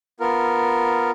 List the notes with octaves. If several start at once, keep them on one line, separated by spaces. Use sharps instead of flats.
B3 F4 A#4